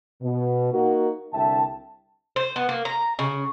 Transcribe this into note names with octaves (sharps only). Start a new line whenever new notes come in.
B2
A#3 D#4 F#4 A#4
C2 D3 E5 G5 A5
C5
B3
A#3
A#5
C#3